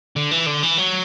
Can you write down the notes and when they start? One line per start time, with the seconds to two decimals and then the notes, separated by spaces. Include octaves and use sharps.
0.16 D3
0.31 E3
0.46 D3
0.63 E3
0.78 F#3